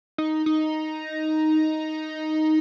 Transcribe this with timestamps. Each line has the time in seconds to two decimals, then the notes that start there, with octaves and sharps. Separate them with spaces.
0.18 D#4
0.46 D#4